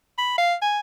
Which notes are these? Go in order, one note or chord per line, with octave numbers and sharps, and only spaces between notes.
B5
F5
G#5